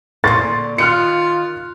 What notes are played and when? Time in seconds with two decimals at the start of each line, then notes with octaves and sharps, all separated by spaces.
0.24 A#2 D3 C6 C#6 A6
0.78 D#3 F4 F6 F#6 C#7